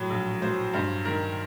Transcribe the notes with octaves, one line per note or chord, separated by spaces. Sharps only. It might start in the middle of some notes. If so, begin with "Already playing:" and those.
Already playing: A2 F#3
A#1
F#3 C5
G2 C5
D#3 A#4